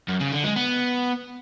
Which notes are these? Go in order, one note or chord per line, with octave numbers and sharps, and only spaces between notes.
F#2
C#3
D3
G#3
B3